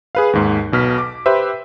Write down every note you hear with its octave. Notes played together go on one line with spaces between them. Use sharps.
G#4 B4 F5
D#2 G#2
B1 B2 F6 B6
D6
G4 B4 C5 E5